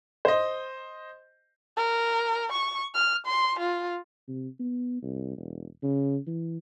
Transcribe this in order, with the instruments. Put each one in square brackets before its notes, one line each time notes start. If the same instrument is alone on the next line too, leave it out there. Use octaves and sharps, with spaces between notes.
[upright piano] C5 D#5
[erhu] A#4
C#6
F6
C6
F4
[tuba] C3
B3
C2
E1
C#3
E3